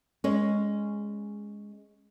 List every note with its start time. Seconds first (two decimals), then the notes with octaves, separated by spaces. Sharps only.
0.24 G#3 C#4